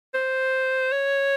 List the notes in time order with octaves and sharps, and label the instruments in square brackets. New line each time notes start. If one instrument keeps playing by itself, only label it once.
[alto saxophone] C5
C#5